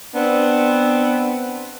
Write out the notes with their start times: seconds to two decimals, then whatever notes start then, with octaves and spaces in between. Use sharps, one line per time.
0.15 B3 C4 D4